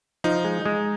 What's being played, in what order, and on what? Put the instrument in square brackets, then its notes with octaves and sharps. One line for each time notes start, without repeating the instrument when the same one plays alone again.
[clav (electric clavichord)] F3 [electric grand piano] D#4
[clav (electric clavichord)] G#3
G#3